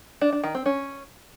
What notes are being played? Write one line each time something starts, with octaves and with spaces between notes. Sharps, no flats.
D4
D4
D#3
C4
C#4